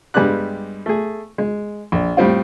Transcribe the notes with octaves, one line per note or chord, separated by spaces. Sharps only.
G2 G3 G#3 B3 D5 F#6
A3 G#4
G#3
A#1
A2 G3 C4 F4